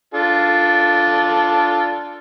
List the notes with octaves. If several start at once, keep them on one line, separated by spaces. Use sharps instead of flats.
D4 F4 A4